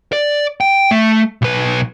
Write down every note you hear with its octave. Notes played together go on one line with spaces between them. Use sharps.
D5
G5
A3
B1 B4